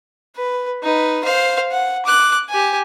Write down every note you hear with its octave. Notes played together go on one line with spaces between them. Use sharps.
B4
D#4 B4
C5 F5
F#5
D6 F#6
G4 G#5